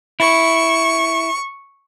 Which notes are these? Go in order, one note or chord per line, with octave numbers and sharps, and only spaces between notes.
E4 C#6